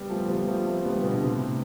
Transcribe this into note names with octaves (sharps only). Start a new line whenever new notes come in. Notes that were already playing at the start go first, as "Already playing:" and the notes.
Already playing: G3 B3
F3 A3
G3 B3
F3 A3
A3 C4
G3 B3
B2 D3
A2 C3